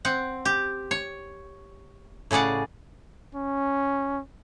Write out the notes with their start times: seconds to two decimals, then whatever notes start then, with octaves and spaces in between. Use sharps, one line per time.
0.05 C4 F#5
0.45 G4
0.91 C#5
2.31 A2 C#3 G#4 D5 F#5
3.35 C#4